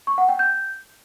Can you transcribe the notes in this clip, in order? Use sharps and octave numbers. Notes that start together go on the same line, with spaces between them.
C#6
F#5
G5
G6